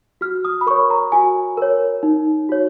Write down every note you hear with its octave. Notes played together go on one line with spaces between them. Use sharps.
F#4 F6
D#6
B5
A#4 C#5 C#6
A#5
F#4 G#5
A#4 C#5
D#4
F#4 C#5